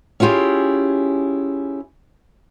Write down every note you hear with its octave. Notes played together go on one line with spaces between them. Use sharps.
C#4 E4 F4 G4 G#4